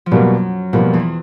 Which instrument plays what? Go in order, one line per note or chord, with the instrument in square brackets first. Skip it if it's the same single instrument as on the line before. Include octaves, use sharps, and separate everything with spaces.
[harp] F3
[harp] F#2 F#3 [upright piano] B2 G3 A#3
[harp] F2 F3 [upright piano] B2 G3 A#3
[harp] E2 E3